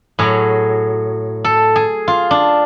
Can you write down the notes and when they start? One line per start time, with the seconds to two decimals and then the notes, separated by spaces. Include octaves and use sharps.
0.19 A2 F#3 G#4
1.45 A4
1.76 G#4
2.08 F4
2.31 D4